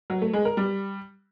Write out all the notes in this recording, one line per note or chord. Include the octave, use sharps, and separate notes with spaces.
F#3
A3
G#3
A#4
G3